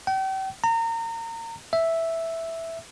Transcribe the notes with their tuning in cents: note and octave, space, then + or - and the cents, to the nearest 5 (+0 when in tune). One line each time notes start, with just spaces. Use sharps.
G5 -40
A#5 -30
E5 +0